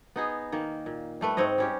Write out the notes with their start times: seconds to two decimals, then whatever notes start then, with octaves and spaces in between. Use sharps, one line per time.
0.16 B3 D#4 G#4
0.52 D#3 A#3
0.86 A#2
1.21 G3 A3 B4
1.37 G#2 C4 C#5 D#5
1.58 G3 C#4 G4